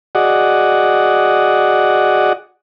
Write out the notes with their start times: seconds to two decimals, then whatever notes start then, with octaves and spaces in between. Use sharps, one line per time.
0.15 F#4 G#4 D5 D#5 F#5